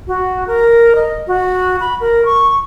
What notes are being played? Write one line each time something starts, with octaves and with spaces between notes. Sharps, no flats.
F#4
A#4
D#5
F#4
B5
A#4
C#6